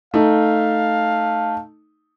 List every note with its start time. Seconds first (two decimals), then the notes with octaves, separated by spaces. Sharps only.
0.14 A3 D#4 F5